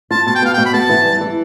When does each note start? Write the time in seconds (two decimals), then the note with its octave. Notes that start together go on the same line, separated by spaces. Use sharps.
0.11 F4 A5
0.27 B2 A5
0.35 G5
0.42 B3 F5
0.54 B2 G5
0.66 B5
0.74 B3 A5
0.90 E3
1.05 G3
1.21 E3